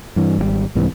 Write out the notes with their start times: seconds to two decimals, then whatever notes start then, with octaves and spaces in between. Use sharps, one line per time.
0.16 G2 E3
0.38 G#1 D#3 G3
0.75 C2 G#2 C3 E3